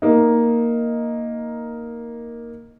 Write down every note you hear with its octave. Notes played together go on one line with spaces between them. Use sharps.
A#3 D#4